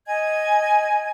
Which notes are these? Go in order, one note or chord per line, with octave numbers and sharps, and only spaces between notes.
D#5 G#5 G#6